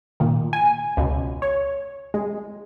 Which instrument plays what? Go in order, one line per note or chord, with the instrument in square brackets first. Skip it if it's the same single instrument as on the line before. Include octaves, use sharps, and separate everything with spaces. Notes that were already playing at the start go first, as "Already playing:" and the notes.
[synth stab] A#2 D#3
G#5
C#2 B2
C#5
G#3